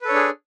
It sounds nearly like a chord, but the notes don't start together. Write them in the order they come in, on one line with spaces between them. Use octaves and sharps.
B4 A4 C#5 D4 G#4